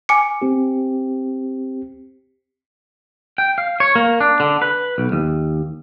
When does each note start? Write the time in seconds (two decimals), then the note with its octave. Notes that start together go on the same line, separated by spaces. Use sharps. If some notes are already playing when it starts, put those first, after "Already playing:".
0.09 G#5 D6 C#7
0.42 C4 G4
3.38 G5
3.58 F5
3.80 C#5
3.95 A#3
4.20 D4
4.40 D3
4.62 B4
4.98 B1
5.12 D#2